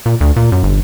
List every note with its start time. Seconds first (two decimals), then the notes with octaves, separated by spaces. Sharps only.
0.06 A#2
0.21 D2
0.36 A#2
0.52 F#2
0.63 G1